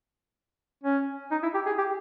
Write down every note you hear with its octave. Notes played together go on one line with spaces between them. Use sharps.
C#4
D#4
E4
G4
G#4
G4